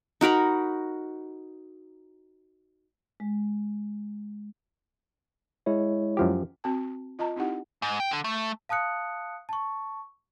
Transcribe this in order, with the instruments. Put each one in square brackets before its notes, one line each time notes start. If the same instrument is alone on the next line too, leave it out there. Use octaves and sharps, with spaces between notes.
[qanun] D#4 F#4 A#4 B5
[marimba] G#3
[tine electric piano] G#3 E4 C#5
[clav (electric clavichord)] F#2 F3 G4
[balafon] C4 F#4 A5
F4 D#5 A5 A#5
C4 D#4 E4 G4 F#5
[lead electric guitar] G#2
G5
D3
A3
[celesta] F5 A5 D#6 F#6 C#7
A5 C#6